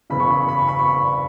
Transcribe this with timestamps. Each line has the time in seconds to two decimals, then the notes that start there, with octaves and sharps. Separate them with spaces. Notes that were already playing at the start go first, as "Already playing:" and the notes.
0.10 F#1 E2 C#3 B5
0.20 C#6
0.30 B5
0.40 C#6
0.49 B5
0.59 C#6
0.69 B5
0.79 C#6
0.88 B5